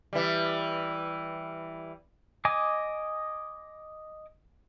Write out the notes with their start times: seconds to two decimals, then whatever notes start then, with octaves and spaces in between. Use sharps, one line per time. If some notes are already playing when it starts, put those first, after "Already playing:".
0.13 E3 G3
2.45 D#5 G#5 D6